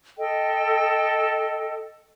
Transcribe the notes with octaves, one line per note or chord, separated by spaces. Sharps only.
A4 D#5 G5